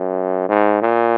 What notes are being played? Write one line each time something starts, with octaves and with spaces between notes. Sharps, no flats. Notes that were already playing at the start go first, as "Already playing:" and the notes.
Already playing: F#2
G#2
A#2